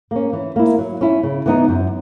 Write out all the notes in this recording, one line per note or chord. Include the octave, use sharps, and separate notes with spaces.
A#3 C#4
E3
A#3 E4
F#3
C#4 E4
C#3
E3 B3 D#4
F#2